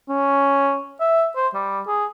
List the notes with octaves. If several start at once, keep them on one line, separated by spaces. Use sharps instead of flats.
C#4
E5
C5
G3
G#4